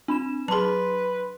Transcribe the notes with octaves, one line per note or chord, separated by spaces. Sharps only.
C4 D4 B5 E7
F#3 G#4 B4 A5 C6